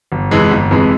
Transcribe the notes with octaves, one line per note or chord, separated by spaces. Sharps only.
G1
F2 C3 E3 G#3
G1
F2 C3 E3 G#3